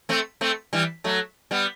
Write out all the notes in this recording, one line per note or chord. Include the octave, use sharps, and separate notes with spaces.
A3 C4
A3 C4
E3 G3
F#3 A3
G3 B3